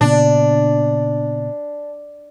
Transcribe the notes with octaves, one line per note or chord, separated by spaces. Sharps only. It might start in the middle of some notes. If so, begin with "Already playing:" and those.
A#2 C#3 B3 D4